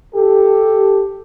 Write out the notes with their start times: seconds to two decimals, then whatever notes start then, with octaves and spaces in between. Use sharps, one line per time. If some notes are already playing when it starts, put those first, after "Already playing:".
0.15 G4 A4